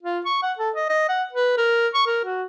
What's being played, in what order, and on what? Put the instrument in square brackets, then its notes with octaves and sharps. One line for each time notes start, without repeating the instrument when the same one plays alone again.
[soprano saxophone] F4
C#6
F#5
A4
D#5
D#5
F#5
B4
A#4
C#6
A#4
F#4